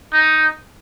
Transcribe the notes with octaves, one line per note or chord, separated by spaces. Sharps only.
D#4